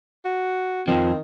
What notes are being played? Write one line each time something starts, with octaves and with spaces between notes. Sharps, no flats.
F#4
F2 D#3 F3 C4